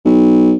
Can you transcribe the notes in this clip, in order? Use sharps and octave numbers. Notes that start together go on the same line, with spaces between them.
B1